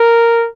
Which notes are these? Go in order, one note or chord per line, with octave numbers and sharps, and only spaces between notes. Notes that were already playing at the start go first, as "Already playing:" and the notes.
Already playing: A#4